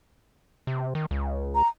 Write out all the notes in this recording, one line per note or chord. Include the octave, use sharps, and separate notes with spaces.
C3
D#3
C#2
A#5